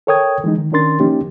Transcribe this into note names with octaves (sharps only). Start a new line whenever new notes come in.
A4 A#4 C#5 G5 D#6 G#6
E3 G#3 D#4
D#3
D#3 C#4 D4 A#4 C6 A6
F3 A#3 C#4 D#4 G4